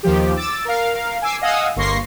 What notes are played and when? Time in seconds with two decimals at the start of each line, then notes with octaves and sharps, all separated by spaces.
0.03 D#2 D#3 F3 G4
0.35 D6 E6 A6
0.65 A#4 F5
1.22 G#5 D6 E6 C7
1.41 D#5 F5 F#5 G#5 D#6 E6
1.76 G1 A#3 C6 C#6 A#6 C7